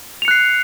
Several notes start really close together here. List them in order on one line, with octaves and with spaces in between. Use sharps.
F7 C#7 F#6 C7